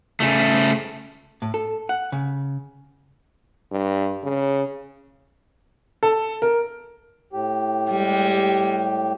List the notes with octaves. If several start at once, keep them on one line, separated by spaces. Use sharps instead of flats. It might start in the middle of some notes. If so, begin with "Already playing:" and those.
C#3 A3
A2
A4
F#5
C#3
G2
C#3
A4
A#4
A2 G4
G3 G#3